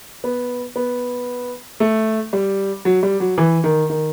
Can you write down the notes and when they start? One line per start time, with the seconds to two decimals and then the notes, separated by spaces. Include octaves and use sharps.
0.24 B3
0.76 B3
1.80 A3
2.33 G3
2.85 F#3
3.03 G3
3.20 F#3
3.38 E3
3.64 D#3
3.90 D#3